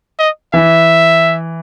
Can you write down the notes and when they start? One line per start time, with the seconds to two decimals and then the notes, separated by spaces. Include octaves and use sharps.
0.19 D#5
0.54 E3 E5